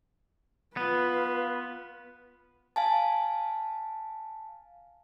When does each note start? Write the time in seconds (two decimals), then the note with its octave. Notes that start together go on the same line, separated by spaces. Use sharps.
0.77 B3 F4 B4
2.76 F5 G#5 A5